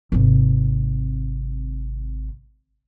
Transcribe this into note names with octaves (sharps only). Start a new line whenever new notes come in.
G#1 C3